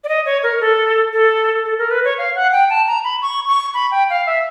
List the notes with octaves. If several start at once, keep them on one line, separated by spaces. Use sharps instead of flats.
D5
D#5
C#5
A#4
A4
A4
A4
A#4
B4
C#5
F5
F#5
G5
A5
A#5
B5
C#6
C#6
B5
G5
F5
E5